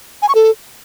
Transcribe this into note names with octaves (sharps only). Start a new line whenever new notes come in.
G#5
C#6
A4